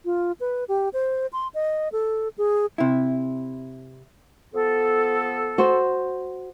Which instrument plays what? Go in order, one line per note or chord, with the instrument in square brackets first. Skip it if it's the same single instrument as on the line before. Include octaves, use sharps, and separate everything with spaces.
[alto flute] F4
B4
G4
C5
C6
D#5
A4
G#4
[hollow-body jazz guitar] C3 E4
[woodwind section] F3 B3 A4
[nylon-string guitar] F#4 C5